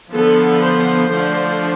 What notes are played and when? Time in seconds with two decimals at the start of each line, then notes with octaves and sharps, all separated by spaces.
0.12 D3 F3 B3 A4
0.62 C5
1.12 D3 F3 A3 D4